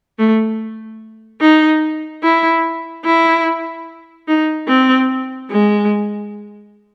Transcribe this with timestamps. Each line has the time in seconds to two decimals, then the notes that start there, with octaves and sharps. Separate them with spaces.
0.19 A3
1.41 D#4
2.23 E4
3.05 E4
4.28 D#4
4.68 C4
5.51 G#3